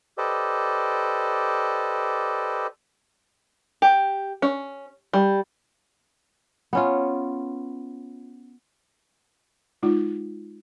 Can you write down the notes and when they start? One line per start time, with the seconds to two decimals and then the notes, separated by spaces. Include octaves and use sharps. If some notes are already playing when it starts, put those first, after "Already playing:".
0.18 G4 A4 B4 C5 D5 D#5
3.82 G4
4.42 C#4
5.13 G3
6.73 B3 C#4 F4
9.83 G#3 D#4 F4